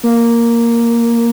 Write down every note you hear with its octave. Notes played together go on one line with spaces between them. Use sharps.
A#3